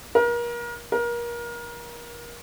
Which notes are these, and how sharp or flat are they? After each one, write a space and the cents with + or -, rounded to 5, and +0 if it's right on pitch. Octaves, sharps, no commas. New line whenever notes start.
A#4 +35
A#4 +30